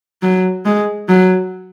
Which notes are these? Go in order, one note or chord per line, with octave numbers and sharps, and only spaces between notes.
F#3
G#3
F#3